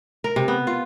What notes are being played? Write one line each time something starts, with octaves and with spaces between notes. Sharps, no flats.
A#4
C3
B3
F4